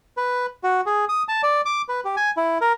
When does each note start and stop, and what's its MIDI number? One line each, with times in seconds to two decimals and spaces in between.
0.17 0.46 71
0.64 0.81 66
0.86 1.05 68
1.09 1.23 87
1.29 1.42 81
1.43 1.61 74
1.65 1.82 86
1.89 2.00 71
2.05 2.16 67
2.17 2.31 80
2.37 2.58 64
2.61 2.73 70